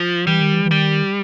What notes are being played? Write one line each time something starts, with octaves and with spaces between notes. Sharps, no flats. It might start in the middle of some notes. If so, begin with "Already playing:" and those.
Already playing: F3
E3 G3
D#3
E3
E3
D#3 G3